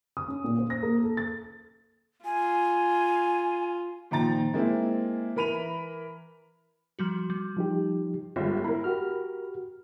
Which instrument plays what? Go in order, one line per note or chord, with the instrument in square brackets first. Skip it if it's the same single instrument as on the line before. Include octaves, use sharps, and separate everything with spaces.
[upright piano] D#6
C#4
A#2
C5
A#6
A#3
A4
A6
[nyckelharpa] F4 [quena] G#5
[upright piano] A#2 D#3 F3 A#5 A6
G#3 A#3 C4 E4
E3 A#4 B5 D#7 F7
[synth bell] F3 G3 F#4
G3
[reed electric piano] F3 D#4 G4
[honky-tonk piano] G1 G#2 G3 [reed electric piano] F4
[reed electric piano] E4 [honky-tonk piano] A#4 B5
[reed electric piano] F#4 G4 F6